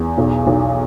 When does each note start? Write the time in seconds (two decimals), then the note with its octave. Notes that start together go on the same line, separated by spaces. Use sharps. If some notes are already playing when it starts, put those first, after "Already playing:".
Already playing: E2
0.18 B1
0.47 B1